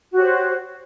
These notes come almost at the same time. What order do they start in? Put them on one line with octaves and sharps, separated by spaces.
F#4 G4 C#5 C5